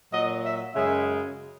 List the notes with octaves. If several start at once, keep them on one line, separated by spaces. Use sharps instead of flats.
A#2 F#3 D#5
E5
F#2 C#3 G#3 E5